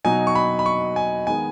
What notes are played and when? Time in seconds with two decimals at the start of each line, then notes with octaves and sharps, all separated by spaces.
0.05 B2 F#3 D#4 G#5
0.27 C#6
0.35 B5
0.59 B5
0.66 C#6
0.96 G#5
1.27 D#3 G#3 B3 G#5